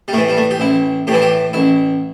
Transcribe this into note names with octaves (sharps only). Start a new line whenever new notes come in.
G3
A2 E3 A3
G3
A3
G4
A1 E4
A2 E3 E4 G4
G4
A1 E4